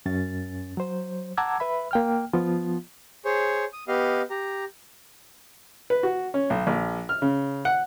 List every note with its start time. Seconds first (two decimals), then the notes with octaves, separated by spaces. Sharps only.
0.06 F#2 C#4 A6
0.77 F#3 C5
1.37 F#5 A5 A#5 D6 E6 G#6
1.60 B4 E5 B5
1.91 A#3 G5 F6
2.33 F3 B3 F4
3.25 G#4 C5 C#5
3.73 D#6
3.88 B3 G4 D#5 F5
4.30 G4 A#5
5.90 B4
6.03 F#4
6.34 C#4
6.50 B1
6.67 A#1
7.09 F6
7.22 C#3
7.65 F#5